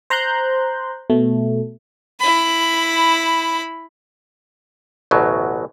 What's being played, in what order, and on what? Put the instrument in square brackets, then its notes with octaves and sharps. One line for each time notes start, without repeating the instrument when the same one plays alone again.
[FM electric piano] C5 A#5 C6 F#6 G6
B2 A3
[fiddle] E4 B5
[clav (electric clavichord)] A1 D2 B2 F#3